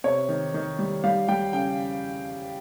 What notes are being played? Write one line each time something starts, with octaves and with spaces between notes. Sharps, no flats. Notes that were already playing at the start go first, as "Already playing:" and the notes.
C3 C#5
D#3
D#3
G3
G3 F5
G3 G5
C#3 G5